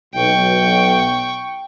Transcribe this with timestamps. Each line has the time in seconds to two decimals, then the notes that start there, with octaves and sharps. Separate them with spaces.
0.14 B1 G5 C#6